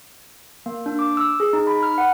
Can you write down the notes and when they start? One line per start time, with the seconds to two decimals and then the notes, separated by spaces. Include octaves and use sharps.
0.66 A#3
0.86 D4
0.99 D6
1.17 E6
1.40 G#4
1.53 D#4
1.67 B5
1.83 F6
1.98 F#5